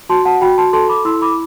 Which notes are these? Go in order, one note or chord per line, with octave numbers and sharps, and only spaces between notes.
F#4 A5 C6
F#5 A5
F#4 G5 B5
A5 C6
A4 A5 C6
B5 D6
E4 C6 E6
B5 D6